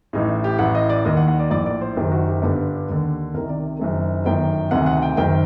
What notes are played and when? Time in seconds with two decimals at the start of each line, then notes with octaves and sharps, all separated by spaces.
0.13 A1 A2 D#4
0.44 G4
0.59 A1 A2 F#5
0.75 D#5
0.90 D5
1.05 D#2 D#3 D#5
1.17 F#5
1.28 F#5
1.40 D5
1.50 A#1 A2 D5
1.66 D5
1.81 C5
1.96 F#1 F#2 D#3 G4
2.12 F#4
2.27 G4
2.42 G1 G2 D3
2.89 D#2 D3
3.34 C2 C3 D#3 A#4
3.49 D5
3.79 F#1 F#2 D#3
4.25 G1 F#2 D#3 G5
4.71 D2 C3 D#3 F#5
4.86 F#5
4.97 F#5
5.02 G5
5.17 F#1 F#2 D#3 G5